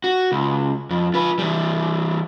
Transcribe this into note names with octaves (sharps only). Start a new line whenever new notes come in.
F#4
C#2
F2
F4 B4
E3 G3